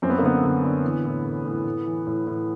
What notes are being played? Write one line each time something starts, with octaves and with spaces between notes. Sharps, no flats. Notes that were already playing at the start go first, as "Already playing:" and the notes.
F#2 C4
B3
A#3
D3 B3
D3
D3
E3
A2
A2
A2
A2
E3
A2
A2